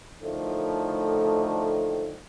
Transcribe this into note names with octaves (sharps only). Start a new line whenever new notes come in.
A2 D3 D#3 F3 A3